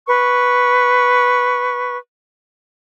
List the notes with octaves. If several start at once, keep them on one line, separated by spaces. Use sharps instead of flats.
B4 C#6